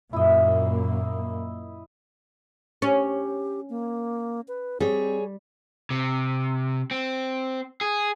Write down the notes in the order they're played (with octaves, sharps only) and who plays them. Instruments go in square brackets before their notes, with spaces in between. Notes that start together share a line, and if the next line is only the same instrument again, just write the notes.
[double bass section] F#2 A#2 A#3 [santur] E4 D#5
[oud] C#4 [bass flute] G4
[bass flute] A#3
B4
[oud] G3 [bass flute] C4 [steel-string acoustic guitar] G#4 C#5
[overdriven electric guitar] C3
C4
G#4